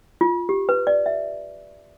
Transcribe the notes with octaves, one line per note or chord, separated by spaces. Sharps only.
F4
G4
B4
D5
E5